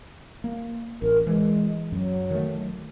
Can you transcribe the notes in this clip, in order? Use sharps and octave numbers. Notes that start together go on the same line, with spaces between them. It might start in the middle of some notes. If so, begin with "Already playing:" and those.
A#3
A1 A#4
E3 G#3
F#2 F#3
D#3 A3